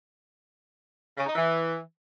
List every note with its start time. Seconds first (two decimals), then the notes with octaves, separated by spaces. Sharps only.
1.17 C#3
1.26 D#4
1.35 E3